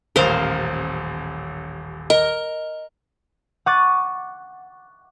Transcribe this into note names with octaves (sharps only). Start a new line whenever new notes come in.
D#1 A1 A#4 C5 F5
A#4 D#5
F#5 C#6 D6 F#6 A6 D#7